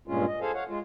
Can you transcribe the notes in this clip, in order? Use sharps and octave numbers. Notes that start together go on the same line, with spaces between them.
G2 A#2 G#3 C#4 F4
D#5
G#4 A4 C5 F5 G#5
C#5 F5 F#5
G#3 F4